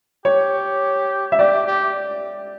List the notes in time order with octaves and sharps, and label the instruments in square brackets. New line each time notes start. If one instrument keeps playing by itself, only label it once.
[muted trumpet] G4 [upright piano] C#5
[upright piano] E5
[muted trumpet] G4 [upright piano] D5
[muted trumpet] G4